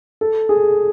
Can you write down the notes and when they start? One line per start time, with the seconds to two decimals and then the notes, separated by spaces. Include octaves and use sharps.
0.21 A4
0.49 G#4